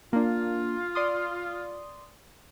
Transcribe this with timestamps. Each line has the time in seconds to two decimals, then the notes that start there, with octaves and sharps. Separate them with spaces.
0.13 A#3 D4 F4
0.95 D5 C6 D#6